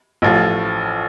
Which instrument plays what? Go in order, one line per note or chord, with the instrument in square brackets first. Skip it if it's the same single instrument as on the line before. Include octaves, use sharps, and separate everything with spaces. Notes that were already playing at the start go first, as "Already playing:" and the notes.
[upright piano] A1 A2 F3